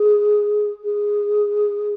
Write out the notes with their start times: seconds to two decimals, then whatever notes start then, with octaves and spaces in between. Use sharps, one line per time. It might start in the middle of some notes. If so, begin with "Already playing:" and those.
Already playing: G#4
0.84 G#4